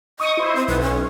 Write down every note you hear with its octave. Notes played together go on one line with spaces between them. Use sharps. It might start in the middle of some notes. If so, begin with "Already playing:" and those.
D#5 C#6 D#6
E4 C5
C4
B1 B4
C#4